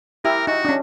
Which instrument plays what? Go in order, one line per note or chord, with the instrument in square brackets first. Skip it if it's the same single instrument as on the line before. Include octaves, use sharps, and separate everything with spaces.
[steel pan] E4 G4 E5 [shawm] A#4
[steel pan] D#4 [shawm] F#4
[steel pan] C#4 D4